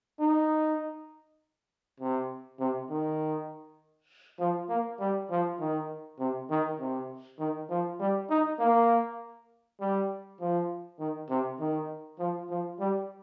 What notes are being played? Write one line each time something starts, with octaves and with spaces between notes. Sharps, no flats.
D#4
C3
C3
D#3
F3
A#3
G3
F3
D#3
C3
D#3
C3
D#3
F3
G3
D#4
A#3
G3
F3
D#3
C3
D#3
F3
F3
G3